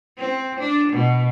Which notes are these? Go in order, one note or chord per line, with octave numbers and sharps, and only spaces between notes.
C4
D4
B2